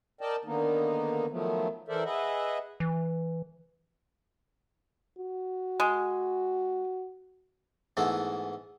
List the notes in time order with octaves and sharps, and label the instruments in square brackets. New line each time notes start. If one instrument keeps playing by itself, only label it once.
[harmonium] A#4 D5 D#5 G5 A5
D3 D#3 A#3 B3 D#4
D#3 F3 F#3 A3 B3
E3 A4 A#4 C5 D5 E5
G#4 B4 D#5 E5 F#5
[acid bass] E3
[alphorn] F#4
[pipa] G#3
[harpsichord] G#2 E3 A3 B3